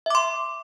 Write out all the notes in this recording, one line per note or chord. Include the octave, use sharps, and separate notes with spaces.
E5 C6 D6